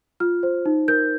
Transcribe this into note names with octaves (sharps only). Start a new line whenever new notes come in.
F4 F6
C5
D#4
A#4 G6